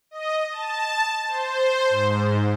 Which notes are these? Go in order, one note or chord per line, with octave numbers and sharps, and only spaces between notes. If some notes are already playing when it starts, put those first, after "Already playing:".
D#5
A5
C5
G#2